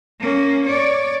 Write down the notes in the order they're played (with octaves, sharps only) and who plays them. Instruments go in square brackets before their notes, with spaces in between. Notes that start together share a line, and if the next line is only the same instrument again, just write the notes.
[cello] A#3 C#4
C#5 D5